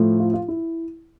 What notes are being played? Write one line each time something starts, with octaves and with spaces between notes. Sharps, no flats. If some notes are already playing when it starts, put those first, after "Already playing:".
Already playing: A2 F3 A3
F4
F4
E4